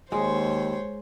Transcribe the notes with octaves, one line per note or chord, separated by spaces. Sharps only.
D#2 G#3 C5 C#5